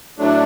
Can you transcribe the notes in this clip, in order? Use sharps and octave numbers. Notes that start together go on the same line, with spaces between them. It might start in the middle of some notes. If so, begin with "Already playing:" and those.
A2 F#3 A3 D4